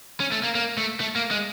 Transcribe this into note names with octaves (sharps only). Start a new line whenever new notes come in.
C#4
A3
A#3
A#3
A3
A3
A#3
G#3